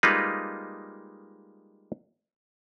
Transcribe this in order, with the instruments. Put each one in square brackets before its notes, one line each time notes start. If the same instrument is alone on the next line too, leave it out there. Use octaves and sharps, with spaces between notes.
[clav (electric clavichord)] G3 G#3 A#3 D#4 F4 B4